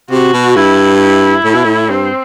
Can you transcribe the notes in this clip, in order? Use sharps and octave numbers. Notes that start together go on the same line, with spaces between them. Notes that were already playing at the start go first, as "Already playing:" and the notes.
C3 F#4
B2
G2 E4
E4
A2
B2
A2
G2 C4